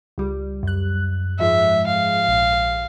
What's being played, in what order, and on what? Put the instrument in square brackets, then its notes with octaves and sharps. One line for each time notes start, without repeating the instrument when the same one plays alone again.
[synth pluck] C#2 G3
F#2 F#6
[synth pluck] G#2 F3 G#3 [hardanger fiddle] E5
[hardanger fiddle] F5
[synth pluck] A#1